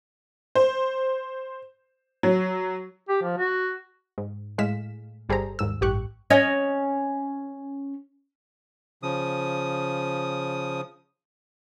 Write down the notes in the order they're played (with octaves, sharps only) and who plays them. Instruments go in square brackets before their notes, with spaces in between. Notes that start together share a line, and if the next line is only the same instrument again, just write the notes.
[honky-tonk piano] C5
F#3
[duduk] G4
F3
F#4
[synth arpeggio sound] G#2
A2 G#3 F5 B6 E7
G1 G3 G#4 A4 C5 A#5
D#2 G#2 E6
A1 G2 G4 C#6 F#6
[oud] C#4 C#5 D#5
[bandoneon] C#3 F3 D#6